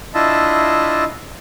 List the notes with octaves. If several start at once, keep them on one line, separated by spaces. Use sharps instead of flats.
D4 E4 F4 D#5 E5 A5